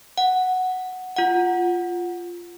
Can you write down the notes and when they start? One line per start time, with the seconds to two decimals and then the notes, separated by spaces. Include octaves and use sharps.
0.18 F#5
1.16 F4 F#5